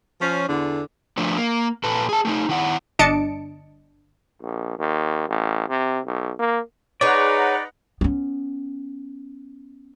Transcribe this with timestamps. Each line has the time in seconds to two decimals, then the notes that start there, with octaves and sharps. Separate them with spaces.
0.21 F3 C#4
0.49 E2 D3
1.17 F3 A3 D4
1.37 A#3
1.84 A#2 A4 B4
2.09 G#4 A5
2.25 A3 C#4 D#4
2.49 D#3 E4 F#5
2.99 G1 D4 D#5 A5 C#7 D7
4.42 A#1
4.79 D#2
5.28 A1
5.69 C3
6.05 B1
6.39 A#3
7.01 D#4 G#4 B4 C#5 D5 F#5 A#5
8.01 B3 C#4